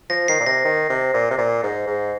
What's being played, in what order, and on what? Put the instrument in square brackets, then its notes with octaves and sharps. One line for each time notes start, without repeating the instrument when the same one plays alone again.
[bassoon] F3 [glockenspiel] A#6
[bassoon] D#3 [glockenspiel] C7
[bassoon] A#2
[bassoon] C3 [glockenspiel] A#6
[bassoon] D#3
C3
A#2
C3
A#2
G#2
G#2